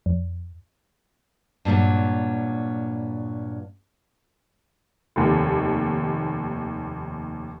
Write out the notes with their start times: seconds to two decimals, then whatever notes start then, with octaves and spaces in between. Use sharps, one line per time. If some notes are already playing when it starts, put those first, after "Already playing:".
0.06 F2
1.65 G2 A#2 D#3 F#3
5.16 F1 D#2